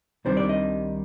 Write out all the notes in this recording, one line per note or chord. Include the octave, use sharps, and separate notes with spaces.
C2 C3 D#3 G3 D4 C5
D5
D#5